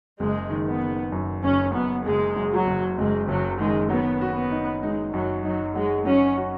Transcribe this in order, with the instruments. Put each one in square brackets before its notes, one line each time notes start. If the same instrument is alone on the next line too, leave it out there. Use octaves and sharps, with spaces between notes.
[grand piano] F#1 [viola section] G#3
[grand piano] D#3
[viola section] B3
[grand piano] D#3
F#2
[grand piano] F#1 [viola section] C#4
[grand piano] F#2 [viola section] B3
[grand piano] F#1 [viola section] G#3
[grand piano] F#2
[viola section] F#3
[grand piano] F#1
[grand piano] F#1 [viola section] G#3
[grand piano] F#1 [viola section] F#3
[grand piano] D#3 [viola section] G#3
[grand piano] F#3 [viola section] B3
[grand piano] F#4
[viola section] B3
[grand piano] D#4
[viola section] G#3 [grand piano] D#4
[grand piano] F#2 [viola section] F#3
[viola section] F#3 [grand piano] D#4
[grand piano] F#3 [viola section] G#3
[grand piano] F#3 [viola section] C#4
[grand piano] F#4